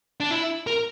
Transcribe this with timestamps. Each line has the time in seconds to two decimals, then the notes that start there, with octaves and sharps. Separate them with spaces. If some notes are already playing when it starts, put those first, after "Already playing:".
0.20 D4
0.31 E4
0.67 A#4